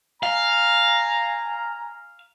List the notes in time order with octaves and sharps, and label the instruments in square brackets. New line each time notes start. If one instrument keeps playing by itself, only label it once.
[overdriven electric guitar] F5 [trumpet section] G#5 A#5